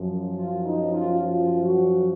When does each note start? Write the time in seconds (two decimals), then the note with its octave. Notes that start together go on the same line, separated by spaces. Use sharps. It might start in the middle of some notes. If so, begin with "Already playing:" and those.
Already playing: F#2 F3
0.37 F4
0.64 D#4
0.93 F4
1.22 F4
1.64 F#4